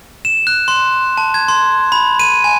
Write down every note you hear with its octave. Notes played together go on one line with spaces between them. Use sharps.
E7
F#6
C6
A5
G#6
C6
B5
D#7
G#5